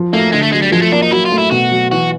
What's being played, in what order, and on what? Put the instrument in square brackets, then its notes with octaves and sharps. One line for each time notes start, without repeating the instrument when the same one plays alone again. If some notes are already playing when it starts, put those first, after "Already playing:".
Already playing: [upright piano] F3
[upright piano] A3 [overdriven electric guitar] A#3
[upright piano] D3 [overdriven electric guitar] G#3
[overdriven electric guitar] A3
[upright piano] F#3 [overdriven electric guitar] G#3
[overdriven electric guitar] G3
[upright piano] F3 [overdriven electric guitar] G#3
[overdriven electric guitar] A3
[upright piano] A#3 [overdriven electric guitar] D4
[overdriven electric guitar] D#4
[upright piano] F#3 [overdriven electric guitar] E4
[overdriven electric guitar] F4
[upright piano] A3
[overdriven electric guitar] E4
[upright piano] B2 [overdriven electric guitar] F#4
[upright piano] F#3
[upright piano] E3 [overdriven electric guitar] F#4